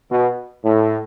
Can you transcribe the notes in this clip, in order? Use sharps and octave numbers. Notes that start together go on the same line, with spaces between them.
B2
A2